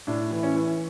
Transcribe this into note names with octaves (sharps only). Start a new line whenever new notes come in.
A2 D4
E3
C#4
E3